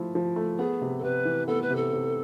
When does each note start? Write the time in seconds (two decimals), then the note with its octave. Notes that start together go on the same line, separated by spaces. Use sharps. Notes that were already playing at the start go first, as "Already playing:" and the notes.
Already playing: F3 A3 E4
0.15 F3
0.36 A3
0.59 B3 G#4
0.81 C3
0.98 A4
1.03 C3 B4
1.25 E3
1.48 B3 A4
1.62 B4
1.70 C3
1.76 A4
1.93 C3